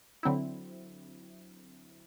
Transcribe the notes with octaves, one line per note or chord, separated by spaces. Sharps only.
D3 F#3 C4 E4